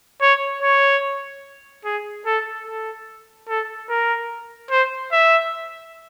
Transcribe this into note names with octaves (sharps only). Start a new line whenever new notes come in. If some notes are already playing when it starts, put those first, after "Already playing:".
C#5
C#5
G#4
A4
A4
A4
A#4
C5
E5